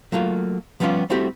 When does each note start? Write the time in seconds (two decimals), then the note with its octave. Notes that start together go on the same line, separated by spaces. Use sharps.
0.12 F#3 A3 A#3 F4
0.80 F3 G3 B3 C#4 F4 D5
1.10 G3 A3 C4 E4 F#4 G4